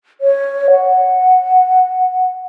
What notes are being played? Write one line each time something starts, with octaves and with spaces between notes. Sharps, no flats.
C#5
F#5